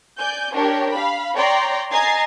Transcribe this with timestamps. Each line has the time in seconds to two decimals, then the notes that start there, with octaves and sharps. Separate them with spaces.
0.18 D5 G#5 G6
0.53 D4 G4 A#4 C#5
0.91 F5 B5
1.36 C#5 D5 G5 A#5 C6
1.91 D#5 G#5 A#5 G#6 A6 C7